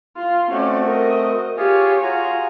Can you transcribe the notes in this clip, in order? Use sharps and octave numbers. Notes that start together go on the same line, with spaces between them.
F4 C6
A3 C4 C#4 F#4 D5
A#4 D#5
F4 G4 G#4 C#5
F4 F#4 G#4 A#5